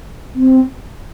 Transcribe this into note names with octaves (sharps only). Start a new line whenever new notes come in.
C4